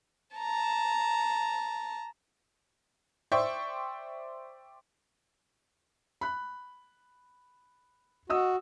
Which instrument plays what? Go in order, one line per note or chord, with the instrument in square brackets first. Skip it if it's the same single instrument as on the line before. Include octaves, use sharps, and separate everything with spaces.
[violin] A5 A#5
[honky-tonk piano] C5 D5 E5 G5 C#6
[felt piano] B5 F#6
[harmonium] F#4 [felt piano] D#5 D#6 E6